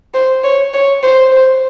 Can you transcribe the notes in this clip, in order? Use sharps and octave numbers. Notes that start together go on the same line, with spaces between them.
C5
C#5
C#5
C5
C5